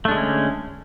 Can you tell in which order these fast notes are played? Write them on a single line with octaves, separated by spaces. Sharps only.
A3 D4 G#3 D3 C#4